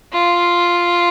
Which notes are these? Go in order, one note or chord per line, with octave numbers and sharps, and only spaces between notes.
F4